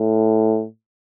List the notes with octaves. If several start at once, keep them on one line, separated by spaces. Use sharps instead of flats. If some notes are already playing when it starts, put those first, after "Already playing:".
Already playing: A2